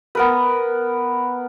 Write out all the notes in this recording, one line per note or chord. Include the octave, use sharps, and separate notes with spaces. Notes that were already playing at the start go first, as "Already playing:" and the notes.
B3 A#4 B4